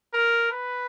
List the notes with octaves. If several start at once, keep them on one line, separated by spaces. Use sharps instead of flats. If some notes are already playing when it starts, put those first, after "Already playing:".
A#4
B4